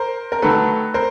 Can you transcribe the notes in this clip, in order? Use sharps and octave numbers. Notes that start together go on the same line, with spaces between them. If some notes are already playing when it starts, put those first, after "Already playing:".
Already playing: A#4 C5
A#4
D#3 F#3 A3 A4 B4
A#4 C5